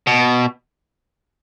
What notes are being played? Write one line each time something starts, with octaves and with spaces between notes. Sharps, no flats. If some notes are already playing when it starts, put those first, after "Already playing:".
B2